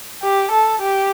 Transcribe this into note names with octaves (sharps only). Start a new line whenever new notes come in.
G4
A4
G4